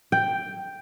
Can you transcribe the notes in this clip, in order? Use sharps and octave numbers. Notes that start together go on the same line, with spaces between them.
G5